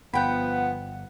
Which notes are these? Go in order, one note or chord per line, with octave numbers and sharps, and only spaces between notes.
G1 F3 B3 F#5 G5 B5